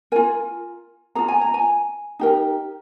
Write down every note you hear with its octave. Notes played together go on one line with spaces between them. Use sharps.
F4 A#4 G#5
F4 G#4 A#5
G#5
A#5
G#5
D#4 G4 A#4